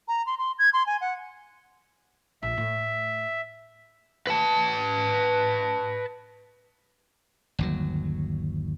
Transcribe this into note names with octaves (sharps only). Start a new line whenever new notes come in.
A#5
C6
C6
G#6
C6
G#5
F#5
A#1 E5
A2 A3
B4 A5
G1 D#2 F#3